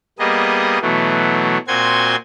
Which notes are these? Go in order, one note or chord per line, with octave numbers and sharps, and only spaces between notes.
G3 A#3 B3 G#4 D#5
B2 E3 F#3 A3
A#2 C4 F#4 G#5 C6 G#6